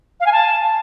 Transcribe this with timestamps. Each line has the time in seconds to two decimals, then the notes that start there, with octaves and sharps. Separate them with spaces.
0.20 F5
0.26 G#5
0.32 A5